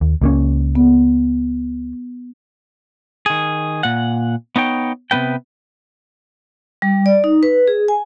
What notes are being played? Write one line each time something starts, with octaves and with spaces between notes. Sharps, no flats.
D#2
C#2 A#3 C#4
B3
D#3 G#4
A#2 F#5
B3 D#4 C#5 G5
C3 F3 B3 B4 G5
G3
D5
D#4
B4
G#4
G#5